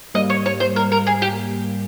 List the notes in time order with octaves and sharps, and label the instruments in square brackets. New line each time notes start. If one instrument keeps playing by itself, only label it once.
[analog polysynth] G#2 G3 A#3 [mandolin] D#5
[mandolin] C#5
C#5
C5
A#4
A#4
G#4
G4